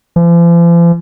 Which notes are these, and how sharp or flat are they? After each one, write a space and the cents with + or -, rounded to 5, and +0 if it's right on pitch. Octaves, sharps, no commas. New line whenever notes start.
F3 -45